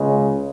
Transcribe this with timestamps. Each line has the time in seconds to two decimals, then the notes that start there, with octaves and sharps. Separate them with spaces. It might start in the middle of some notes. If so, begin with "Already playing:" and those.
Already playing: C#2 C#3 G#3